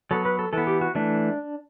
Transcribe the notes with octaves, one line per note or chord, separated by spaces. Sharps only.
F#3 B3 A4
B4
A4
E3 B3 A4
G4
F#4
E3 A3 D4